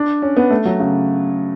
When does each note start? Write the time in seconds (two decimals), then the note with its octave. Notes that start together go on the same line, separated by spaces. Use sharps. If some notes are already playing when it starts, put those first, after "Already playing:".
Already playing: D4
0.22 C#4
0.37 B3
0.50 A3
0.65 F#3
0.79 C#3